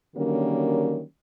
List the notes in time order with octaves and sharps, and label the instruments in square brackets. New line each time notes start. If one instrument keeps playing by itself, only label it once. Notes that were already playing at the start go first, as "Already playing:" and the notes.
[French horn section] D3 D#3 F#3 G3 A#3 C#4